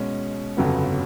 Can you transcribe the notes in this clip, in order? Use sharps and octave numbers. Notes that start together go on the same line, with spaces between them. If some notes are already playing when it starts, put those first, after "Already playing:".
Already playing: B2 G#3 C#4
G1 F2 C#3 F#3 B3